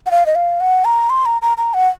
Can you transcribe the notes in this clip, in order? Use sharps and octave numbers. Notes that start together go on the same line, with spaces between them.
F#5
F5
D#5
F5
F#5
A#5
C6
A#5
A#5
A#5
F#5